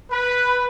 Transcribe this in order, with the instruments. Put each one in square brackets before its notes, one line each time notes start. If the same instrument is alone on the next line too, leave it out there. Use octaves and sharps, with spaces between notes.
[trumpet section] B4